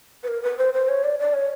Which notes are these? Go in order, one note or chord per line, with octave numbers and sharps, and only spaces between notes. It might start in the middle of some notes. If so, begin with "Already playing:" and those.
B4
A#4
B4
C5
C5
C#5
D5
D5
C#5